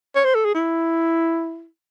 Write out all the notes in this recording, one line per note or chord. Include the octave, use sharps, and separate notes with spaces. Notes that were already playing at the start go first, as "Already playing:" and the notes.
C#5
C5
A4
G#4
E4